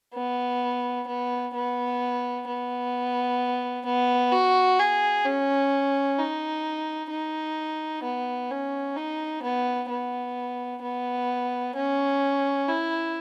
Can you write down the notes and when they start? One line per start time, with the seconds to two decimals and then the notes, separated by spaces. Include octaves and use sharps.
0.14 B3
1.07 B3
1.54 B3
2.47 B3
3.85 B3
4.32 F#4
4.79 G#4
5.24 C#4
6.18 D#4
7.10 D#4
8.03 B3
8.50 C#4
8.96 D#4
9.43 B3
9.89 B3
10.82 B3
11.75 C#4
12.68 E4